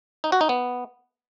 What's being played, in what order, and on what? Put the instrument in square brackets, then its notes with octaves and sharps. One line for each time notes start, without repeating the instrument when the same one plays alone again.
[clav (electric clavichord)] D#4
F#4
D#4
B3